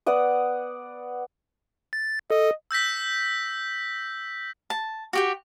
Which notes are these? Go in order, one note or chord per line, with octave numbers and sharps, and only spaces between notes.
B3 D5 F#5 D#6
A6
A4 D#5
E6 G6 A#6 B6
A5
F#4 G4 G5